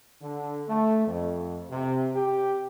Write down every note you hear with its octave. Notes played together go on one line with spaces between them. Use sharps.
D3
A3
F2
C3
G4